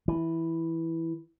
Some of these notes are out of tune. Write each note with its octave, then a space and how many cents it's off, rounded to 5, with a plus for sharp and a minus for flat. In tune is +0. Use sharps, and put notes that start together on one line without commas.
E3 -5